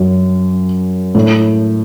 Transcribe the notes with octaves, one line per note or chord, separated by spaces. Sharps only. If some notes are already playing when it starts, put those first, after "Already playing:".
Already playing: F#2
A2